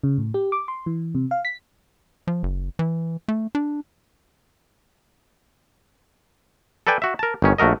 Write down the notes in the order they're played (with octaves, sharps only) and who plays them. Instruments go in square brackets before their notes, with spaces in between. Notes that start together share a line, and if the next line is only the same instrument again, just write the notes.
[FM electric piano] C#3
A2
G4
D6
C6
E3
C3
F5
B6
[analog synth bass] F3
F#1
E3
A3
D4
[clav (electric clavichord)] A4 B4 D5 G5 G#5
F#4 E5
A#4 A5
G1 D#3 C#4
A#1 A3 F#4 A#4 D#5